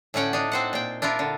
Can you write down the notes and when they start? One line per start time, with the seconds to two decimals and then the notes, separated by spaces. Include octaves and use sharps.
0.14 A2 D3 C#4 F#5 G5
0.33 D4 D#4
0.52 C4 C5 F#5
0.73 A#2 G5
1.02 D4 E4 F4 A#4
1.19 D3